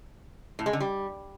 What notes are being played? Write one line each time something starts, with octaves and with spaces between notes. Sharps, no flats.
A2
G#3
D3
G3